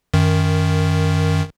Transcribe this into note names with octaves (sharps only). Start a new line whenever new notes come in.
F#2 D#3